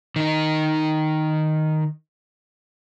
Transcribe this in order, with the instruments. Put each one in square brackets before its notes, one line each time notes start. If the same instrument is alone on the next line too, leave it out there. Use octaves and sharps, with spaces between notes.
[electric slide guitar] D#3 D#4